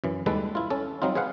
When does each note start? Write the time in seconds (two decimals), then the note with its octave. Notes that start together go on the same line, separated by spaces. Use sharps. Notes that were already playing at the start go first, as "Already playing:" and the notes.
0.04 F#2 E3
0.26 D#2 G3 G#3 A4 B4
0.55 E4 F4
0.70 C#4 A4
1.02 F#3 G3 C4 D#4 F4
1.15 G#4 B4 C5 F5 F#5